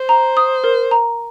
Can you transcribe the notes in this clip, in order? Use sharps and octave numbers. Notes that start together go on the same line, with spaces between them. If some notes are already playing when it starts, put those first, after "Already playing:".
Already playing: C5
A#5
D#6
A#4
A#5